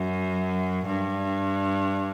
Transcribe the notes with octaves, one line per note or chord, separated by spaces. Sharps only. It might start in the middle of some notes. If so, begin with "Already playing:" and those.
Already playing: F#2
G2